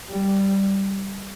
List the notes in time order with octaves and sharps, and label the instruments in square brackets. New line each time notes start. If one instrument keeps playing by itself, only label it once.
[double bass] G3